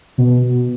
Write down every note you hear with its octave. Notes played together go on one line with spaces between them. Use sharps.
B2